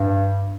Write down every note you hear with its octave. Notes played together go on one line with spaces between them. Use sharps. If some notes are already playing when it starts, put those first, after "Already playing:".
Already playing: G2